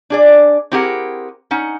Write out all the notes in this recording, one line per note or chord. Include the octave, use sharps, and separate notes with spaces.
D4 G#4 D5
C4 E4 G4 G#4 A#4 F#5
C#4 D#4 F#5